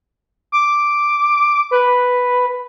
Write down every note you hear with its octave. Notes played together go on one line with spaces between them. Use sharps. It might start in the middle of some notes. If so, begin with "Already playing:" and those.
D6
B4